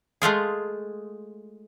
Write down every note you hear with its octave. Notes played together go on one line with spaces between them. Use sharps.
G#3 A3 F4 G#4